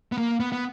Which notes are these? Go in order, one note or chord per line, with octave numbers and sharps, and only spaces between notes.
B3
A#3
B3
B3